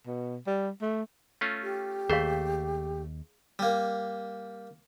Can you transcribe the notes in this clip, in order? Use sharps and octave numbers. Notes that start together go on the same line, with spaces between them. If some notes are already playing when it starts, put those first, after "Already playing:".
B2
G3
A3
A3 C#4 F4
G4
D#2 A3 G#4 C5 F5
G3 A#3